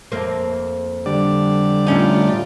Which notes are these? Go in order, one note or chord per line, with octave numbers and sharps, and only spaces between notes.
F2 A#3 C4
D3 G3 D5
A2 C#4 D#4 F4